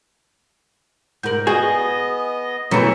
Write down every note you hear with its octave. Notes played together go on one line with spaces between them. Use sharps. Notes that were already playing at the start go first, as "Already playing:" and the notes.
G#2 A#4 G6 F#7
B3 F#4 G#4 D#5
F#2 B2 E3 A3 C#5 A#5 C#7